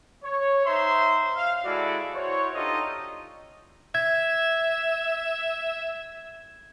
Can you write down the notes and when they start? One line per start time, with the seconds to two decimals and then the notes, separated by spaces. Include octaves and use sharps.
0.24 C#5
0.66 D#4 C5 E5 A#5 C6
1.36 F5
1.65 G#3 E4 F#4 A4 D5
2.15 E4 F#4 C5 C#5
2.55 D4 D#4 F4 G4 A4 D#5
3.95 E5 G#6